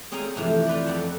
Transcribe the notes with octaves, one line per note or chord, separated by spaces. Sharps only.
C4 G#4 C#5 F5 G#5 A#5
G2 C3 E3 F3 A3
F4 B4 C5 D5
F2 A4 E5 F#5 A5